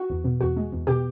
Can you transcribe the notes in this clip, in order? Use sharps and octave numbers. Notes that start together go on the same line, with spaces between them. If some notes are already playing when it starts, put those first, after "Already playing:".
Already playing: F#4
E2
B2
E2 F#4
G#3
E2
B2 G4